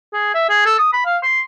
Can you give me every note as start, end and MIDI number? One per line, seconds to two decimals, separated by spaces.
0.14 0.34 68
0.34 0.47 76
0.49 0.65 68
0.66 0.75 69
0.79 0.92 87
0.93 1.02 83
1.06 1.18 77
1.23 1.41 84